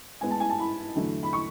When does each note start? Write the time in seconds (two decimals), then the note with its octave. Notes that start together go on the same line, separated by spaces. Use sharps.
0.21 A2 G#3 B3 G#5
0.31 A5
0.40 G#5
0.50 A5
0.59 B5
0.95 E2 D3 F#3 A3
1.23 B5
1.33 C#6